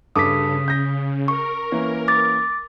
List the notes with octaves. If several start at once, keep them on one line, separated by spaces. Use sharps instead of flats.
G2 C#3 A4 D6 D#6 B6
G6 A#6
A#4 C#6
E3 A#3 C#4
D6 A6